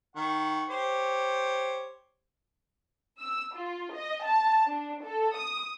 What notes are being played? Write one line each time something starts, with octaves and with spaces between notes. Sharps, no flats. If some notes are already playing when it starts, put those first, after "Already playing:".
D#3 F#5 C#6
G4 C5 C#5
E6
F4
D#5
A5
D4
A4
D#6